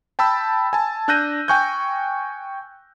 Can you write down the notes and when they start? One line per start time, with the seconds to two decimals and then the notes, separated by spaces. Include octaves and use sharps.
0.19 G5 A5 B5 E6
0.73 G#5 A5
1.08 D4 E6 F#6 G6 A#6 D#7
1.48 G5 G#5 C#6 F#6 G6